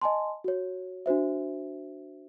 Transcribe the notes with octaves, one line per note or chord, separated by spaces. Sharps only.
D#5 G#5 A5 C6
F#4 C#5
D4 F#4 C5 E5